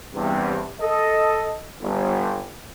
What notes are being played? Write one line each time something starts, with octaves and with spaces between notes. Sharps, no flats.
E2 G2 C3
A4 D#5
G1